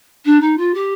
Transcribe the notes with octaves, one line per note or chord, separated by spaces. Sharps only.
D4
D#4
F4
G4